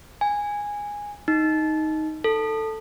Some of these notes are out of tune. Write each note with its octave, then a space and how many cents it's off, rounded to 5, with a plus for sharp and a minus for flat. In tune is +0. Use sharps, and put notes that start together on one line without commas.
G#5 -10
D#4 +5
A4 +10